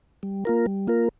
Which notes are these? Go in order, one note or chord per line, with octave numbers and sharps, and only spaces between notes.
G3
A#3 F4 A#4
G3
A#3 F4 A#4